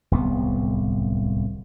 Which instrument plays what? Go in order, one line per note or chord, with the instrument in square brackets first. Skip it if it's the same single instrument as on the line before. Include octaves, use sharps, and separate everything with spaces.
[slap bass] D1 C2 B3